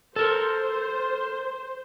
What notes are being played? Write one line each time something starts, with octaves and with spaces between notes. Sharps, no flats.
A4 A#4 C5